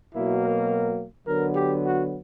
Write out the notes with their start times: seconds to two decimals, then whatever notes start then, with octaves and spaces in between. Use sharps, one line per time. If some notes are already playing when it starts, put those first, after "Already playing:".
0.14 B2 F#3 A#3 E4
0.43 A#4
1.27 D3 F#3 B3 A#4
1.55 G4
1.84 F#4